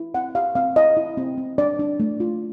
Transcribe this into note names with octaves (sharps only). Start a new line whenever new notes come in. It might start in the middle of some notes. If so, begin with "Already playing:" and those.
Already playing: E4
C4 F#5
G4 F5
C4 F5
E4 D#5
E4
C4
C4
D4 D5
D4
A3
F4